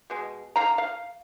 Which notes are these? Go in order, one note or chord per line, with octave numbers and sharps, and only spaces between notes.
B2 G#3
D3 F5 A#5
F5